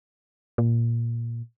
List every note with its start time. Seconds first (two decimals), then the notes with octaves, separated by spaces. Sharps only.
0.58 A#2